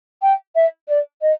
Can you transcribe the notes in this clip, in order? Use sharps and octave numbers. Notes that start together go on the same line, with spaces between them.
G5
E5
D5
D#5